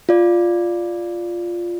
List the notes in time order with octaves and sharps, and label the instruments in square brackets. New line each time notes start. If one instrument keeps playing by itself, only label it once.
[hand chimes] F4 D5